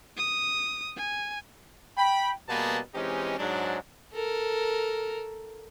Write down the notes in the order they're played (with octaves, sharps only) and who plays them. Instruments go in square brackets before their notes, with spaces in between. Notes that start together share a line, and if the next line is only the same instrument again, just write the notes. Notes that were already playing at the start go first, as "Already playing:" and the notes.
[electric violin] D#6
G#5
[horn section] G5 B5
B2 G3 A#3 B3 G#4 A5
E3 G#3 C4 C#4 D#4 G4
G#2 F#3 D4
[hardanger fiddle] A4 A#4